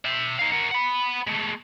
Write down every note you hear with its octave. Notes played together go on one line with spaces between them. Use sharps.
E5 G5
D#4 F5
A#4 F#5
F#5 B5
G#3 A3